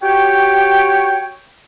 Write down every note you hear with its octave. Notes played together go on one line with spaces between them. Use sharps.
F#4 G4 C#5 G5